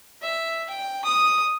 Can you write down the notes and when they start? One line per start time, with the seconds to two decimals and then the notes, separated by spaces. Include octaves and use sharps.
0.22 E5
0.69 G5
1.05 D#6